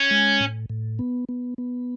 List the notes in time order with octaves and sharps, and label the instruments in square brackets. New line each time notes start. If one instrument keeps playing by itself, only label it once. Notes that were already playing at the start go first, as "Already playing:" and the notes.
Already playing: [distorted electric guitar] C#4
[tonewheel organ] G#3
A2
A2
B3
B3
B3